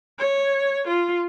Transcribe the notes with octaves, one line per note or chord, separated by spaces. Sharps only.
C#5
F4